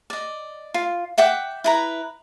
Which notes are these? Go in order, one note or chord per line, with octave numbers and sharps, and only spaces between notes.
D5 D#5
F4
E5 F#5 G5 D6
E4 B4 A#5